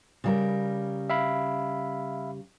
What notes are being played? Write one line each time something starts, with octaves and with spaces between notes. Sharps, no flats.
C#3 G3 A#4
E5 F5 B5